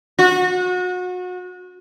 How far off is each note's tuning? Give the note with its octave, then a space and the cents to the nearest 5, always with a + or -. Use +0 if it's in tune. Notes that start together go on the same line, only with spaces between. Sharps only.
F#4 -30